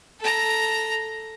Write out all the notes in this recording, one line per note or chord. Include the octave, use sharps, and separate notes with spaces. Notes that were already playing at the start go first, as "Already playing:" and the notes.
A4 A#5